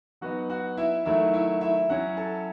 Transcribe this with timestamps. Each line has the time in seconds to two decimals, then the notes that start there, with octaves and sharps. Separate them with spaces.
0.21 F#3 B3 D#4 F#4 F#5
0.49 F#4 F#5
0.77 E4 E5
1.05 D#3 F#3 A3 E4 E5
1.34 E4 E5
1.61 E4 E5
1.89 F#3 C#4 E4 F#4 F#5
2.17 A4 A5